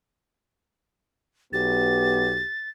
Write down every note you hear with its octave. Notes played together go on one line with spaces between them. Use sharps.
B1 B3 G4 A6